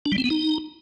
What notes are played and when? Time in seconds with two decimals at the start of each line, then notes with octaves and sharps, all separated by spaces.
0.06 D4
0.12 G3
0.18 C4
0.24 B3
0.30 D#4